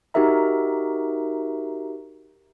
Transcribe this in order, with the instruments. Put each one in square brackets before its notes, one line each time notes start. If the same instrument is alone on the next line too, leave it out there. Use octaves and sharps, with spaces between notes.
[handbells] D#4 F#4 G4 A#4 E5 A#5